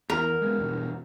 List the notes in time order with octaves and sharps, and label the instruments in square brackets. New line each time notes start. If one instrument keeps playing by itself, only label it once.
[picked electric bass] E2 [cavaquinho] A#4
[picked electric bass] G#3 B3
E2 G2 B2